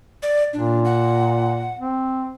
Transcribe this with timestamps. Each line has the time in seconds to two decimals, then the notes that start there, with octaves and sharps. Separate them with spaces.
0.23 D5
0.53 A#2 D4
0.85 F#5
1.79 C4